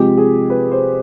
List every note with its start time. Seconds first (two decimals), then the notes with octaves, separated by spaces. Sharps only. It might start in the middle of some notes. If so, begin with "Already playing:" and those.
Already playing: C3 F3 G#3 G4
0.18 G#4
0.50 B4
0.71 C5